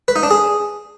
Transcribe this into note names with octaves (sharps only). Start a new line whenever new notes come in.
B4
D#4
D4
G#4